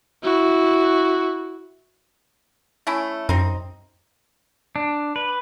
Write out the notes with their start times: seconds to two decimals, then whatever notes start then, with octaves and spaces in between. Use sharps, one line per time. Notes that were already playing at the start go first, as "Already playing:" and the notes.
0.24 E4 F#4
2.87 A3 C#4 E4
3.29 F#2 C4 D#4
4.76 D4
5.16 B4